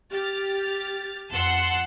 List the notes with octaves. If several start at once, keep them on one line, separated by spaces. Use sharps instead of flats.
G4 F6 A6
F2 F#5 A5 C6 E6 F#6